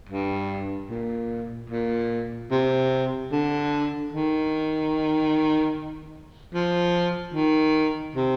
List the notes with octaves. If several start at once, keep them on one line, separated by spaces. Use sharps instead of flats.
G2
A#2
A#2
C3
D3
D#3
F3
D#3
C3